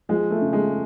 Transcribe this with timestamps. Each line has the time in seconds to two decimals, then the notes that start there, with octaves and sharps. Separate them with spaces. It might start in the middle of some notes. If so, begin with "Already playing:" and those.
0.09 F3 G#3
0.30 A3
0.42 C#3
0.53 G#3